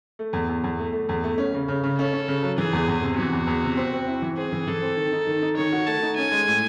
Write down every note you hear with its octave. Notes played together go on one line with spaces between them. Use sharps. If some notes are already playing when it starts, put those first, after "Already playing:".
A3
E2
E2
E2
A3
A3
E2
A3
C#4
C#3
C#3
C#3
C#4 A4
C#4
C#3
F#3
E3 G#4
E2
E2
C3
E3 F#4
E2
E2
C3
C4
C4
E4
E3
C4 G#4
E3
E3 A4
C4
D#3
D#4
D#3
D#4
D#3 C#5
F#4
A3 A5
D#4
C#4 G#5
G#3
A2